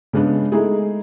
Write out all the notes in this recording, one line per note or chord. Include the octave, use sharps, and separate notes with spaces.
C#3 G#3 B3 D4
G#3 A3 D#4 E4 G#4